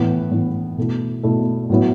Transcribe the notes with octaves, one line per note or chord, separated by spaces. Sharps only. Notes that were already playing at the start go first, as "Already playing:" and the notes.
Already playing: A2 E3 B3 E4
A2 E3 B3 E4
B2 A3 E4
B2 A3 E4
A2 F#3 B3 E4